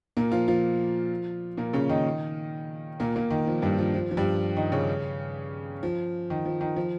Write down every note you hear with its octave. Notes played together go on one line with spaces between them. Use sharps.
A#2 A#3
F3 F4
F3 F4
A#2 A#3
C#3 C#4
D#3 D#4
A#2 A#3
A#2 A#3
D#3
F3
G2 G3
F3
F3
F3
G2 G3
D#3 D#4
C#3 C#4
F3
D#3
F3
D#3
F3